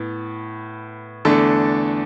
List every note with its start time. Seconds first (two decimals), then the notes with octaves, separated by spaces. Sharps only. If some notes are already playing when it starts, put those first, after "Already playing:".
Already playing: A2 B3
1.25 E2 D3 A3 D4 A4